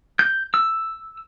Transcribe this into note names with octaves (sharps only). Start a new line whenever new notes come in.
G6
E6